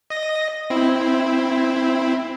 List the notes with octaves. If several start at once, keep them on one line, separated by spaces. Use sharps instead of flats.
D#5 A#6
C4 E4